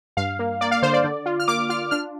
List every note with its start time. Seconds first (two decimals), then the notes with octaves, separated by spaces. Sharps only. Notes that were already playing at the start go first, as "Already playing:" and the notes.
0.17 G2 F5
0.39 A#3
0.61 A#3 D5
0.71 F5
0.82 D3 C5
0.93 D5
1.04 D3
1.26 F4
1.40 F6
1.48 A#3 D6
1.69 F4 F6
1.91 D4 F6